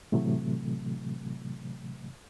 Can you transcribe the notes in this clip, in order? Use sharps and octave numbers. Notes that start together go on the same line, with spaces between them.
A2 C3 E3 F#3 A3